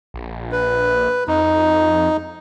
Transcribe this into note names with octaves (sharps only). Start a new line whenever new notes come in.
A#1
B4
F2 D#4